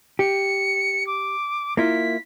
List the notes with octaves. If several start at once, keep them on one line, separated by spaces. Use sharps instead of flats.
G4 C#7
D6
A#3 E4 F4 B6